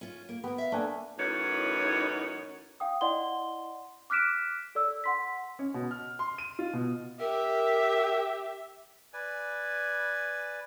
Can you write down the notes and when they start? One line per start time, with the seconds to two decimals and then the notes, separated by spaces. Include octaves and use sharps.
0.01 C#4 F4
0.29 A#3
0.44 B3 G4 A#4
0.58 E5 F5
0.72 A3 A#3 D4 G#5
1.18 F#2 A2 E3 D#4 C#5
2.80 F5 G5 D#6
3.01 E4 D5 D#5 F#5 C6 G7
4.10 D6 F6 F#6 B6 D7 E7
4.75 A4 D5 E6
5.04 F#5 C6 B6
5.59 C#4
5.74 B2
5.91 F6
6.19 C6
6.38 D#7
6.59 F4
6.73 B2
7.20 G4 A#4 E5
9.13 B4 D5 G#5